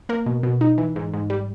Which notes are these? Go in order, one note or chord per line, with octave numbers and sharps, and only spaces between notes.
A#3 A#4
B2
B2
D#4
E3
G#2
G#2
G3